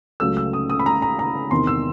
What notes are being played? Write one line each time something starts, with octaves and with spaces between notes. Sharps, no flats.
C#2 C#3 F#3 A3 E6
E6
D#6
D#6
B5
A#5
A#5
A#5
E2 C3 D#3 C6
E6